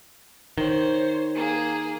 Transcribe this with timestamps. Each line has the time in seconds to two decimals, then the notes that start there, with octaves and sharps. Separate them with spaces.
0.58 D#3 C5 C#5
1.35 A#3 G#4